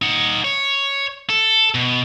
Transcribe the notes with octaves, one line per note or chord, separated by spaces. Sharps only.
D#4 F#5
C#5
A4
B2